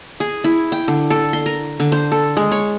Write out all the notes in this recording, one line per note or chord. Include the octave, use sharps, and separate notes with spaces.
G#4
E4
G5
D3
A4
C6
A#4
D3
C5
A4
G#3
C#5